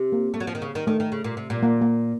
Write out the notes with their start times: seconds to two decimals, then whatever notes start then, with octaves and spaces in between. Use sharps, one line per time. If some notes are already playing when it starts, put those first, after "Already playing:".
Already playing: C3
0.12 A#3
0.34 A3
0.40 F#3
0.47 F3
0.55 D#3
0.62 C#3
0.75 D#3
0.87 D#3 A3
1.00 D#3
1.12 C#3
1.24 A#2
1.37 C3
1.50 A#2
1.63 A#3
1.81 A#3